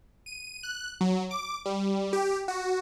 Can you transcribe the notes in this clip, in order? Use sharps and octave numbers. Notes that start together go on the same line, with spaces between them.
D#7
F#6
F#3
D6
G3
G4
F#4